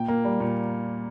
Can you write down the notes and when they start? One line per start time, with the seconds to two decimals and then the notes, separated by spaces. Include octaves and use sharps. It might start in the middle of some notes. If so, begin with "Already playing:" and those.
Already playing: A#2 G5
0.08 A#3
0.25 G3
0.40 A#2